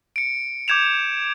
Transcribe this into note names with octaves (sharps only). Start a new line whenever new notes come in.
C#7 D7
D6 G6 G#6 E7 F7